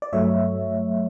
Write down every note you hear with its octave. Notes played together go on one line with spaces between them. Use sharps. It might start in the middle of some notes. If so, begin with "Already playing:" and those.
D5
G2 F#3 A3 C#5 E5